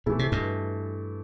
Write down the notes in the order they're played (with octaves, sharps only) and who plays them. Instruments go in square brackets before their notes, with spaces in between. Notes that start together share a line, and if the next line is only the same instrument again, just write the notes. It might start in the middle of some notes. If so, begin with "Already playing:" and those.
[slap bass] B2 [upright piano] E3 A3 E4 A4
[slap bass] C3
G2 B2